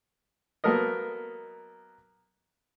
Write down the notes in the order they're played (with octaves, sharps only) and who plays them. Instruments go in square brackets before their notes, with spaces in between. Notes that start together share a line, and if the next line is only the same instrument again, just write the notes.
[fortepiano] F#3 A#3 B3 A4 A#4 D#5